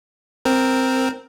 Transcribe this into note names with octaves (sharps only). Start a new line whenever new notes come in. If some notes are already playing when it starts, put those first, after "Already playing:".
C4 A#4